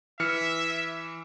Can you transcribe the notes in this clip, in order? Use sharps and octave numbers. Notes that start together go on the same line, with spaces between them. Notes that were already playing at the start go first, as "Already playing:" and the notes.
E3 E5 F6 C#7